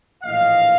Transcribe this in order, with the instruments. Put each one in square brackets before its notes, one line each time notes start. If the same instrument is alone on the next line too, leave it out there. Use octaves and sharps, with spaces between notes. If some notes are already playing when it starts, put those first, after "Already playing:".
[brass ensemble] A#1 A2 E3 D#5 F5